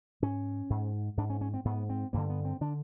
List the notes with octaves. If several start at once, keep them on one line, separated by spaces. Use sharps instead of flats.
G#2 C#4
G#2
G#2 D4
C#4
C#4
C4
G#2 B3
C4
G2 D3 A#3
B3
C4
D3 D4